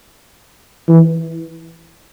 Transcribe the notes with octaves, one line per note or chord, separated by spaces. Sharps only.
E3